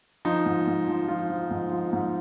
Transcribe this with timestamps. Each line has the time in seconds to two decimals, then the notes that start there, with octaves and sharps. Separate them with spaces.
0.25 F3 D#4
0.46 G#2
0.67 G#2
0.88 F3
1.08 F3 F4
1.30 F3
1.50 G#2
1.72 F3
1.93 G#2